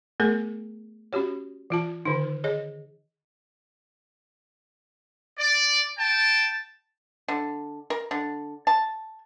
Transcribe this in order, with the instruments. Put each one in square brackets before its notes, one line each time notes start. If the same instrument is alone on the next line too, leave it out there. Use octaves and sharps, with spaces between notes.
[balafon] A3 B3 G#4 A#4
C#4 F#4 G4 C#5
E3 F4 A5
D3 D#3 D#4
G#4 C#5 D#5
[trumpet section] D5
G5 A5
[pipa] D3
A#4
D3
A5